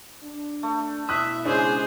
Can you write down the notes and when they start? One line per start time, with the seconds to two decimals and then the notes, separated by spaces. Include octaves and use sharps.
0.24 D4
0.63 A3
1.09 B2 E4 E5 D#6 F#6
1.45 C#3 G#3 D4 G#4 C5